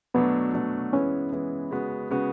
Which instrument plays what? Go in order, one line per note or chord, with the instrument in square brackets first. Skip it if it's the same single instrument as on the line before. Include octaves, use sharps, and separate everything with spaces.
[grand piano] B2 F#3 A3 D4 [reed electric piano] B3
[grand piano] B2 F#3 A3 D4
[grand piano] E3 G#3 B3 E4 [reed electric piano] C#4
[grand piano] E3 G#3 B3 E4
C#3 G#3 B3 F#4
C#3 G#3 B3 F#4